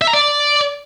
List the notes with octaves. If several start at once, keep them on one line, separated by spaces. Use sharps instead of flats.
E5
A#5
D5